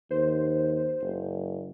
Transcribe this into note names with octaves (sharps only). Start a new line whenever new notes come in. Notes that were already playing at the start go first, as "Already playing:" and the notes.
D#2 C5
F#1